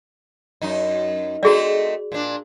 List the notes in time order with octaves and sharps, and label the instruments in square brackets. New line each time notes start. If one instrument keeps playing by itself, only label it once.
[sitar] F#2 D#4
[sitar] A3 C4 D#4 [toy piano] F#4 G#4 D5
[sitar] A#2 D4